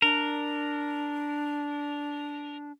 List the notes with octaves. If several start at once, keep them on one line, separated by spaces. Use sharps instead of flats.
D4 A#4